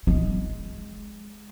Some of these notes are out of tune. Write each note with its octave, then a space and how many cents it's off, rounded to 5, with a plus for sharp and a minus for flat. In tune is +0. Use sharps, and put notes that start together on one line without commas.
G#3 +5